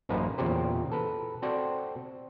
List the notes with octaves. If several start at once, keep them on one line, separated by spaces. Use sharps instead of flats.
A1 F#2 A#3 D#4 B4 C5
E2 A#2 C#3 G4 C5
A4 B4
C4 F#4 A4 C5 D5